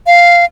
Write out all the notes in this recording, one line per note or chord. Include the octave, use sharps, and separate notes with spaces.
F5